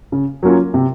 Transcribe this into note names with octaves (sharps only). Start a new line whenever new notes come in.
C#3
F#3 A#3 C#4 F4
C3